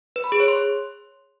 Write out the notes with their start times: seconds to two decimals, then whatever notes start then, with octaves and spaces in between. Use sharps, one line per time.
0.16 B4
0.24 B5
0.32 G#4
0.40 C#5
0.48 C6